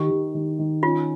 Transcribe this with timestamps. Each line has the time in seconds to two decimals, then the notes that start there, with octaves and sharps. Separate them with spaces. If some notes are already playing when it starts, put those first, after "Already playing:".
Already playing: D#3 G4
0.10 D#3
0.34 D#3
0.59 D#3
0.83 C#4 F4